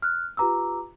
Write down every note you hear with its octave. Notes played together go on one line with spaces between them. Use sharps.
F6 F#6
F4 G4 B4 A#5 D6 E6